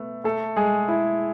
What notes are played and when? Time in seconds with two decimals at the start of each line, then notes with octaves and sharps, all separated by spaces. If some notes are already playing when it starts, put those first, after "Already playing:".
Already playing: A3 B3
0.24 A3 A4
0.56 G#3 G#4
0.88 E4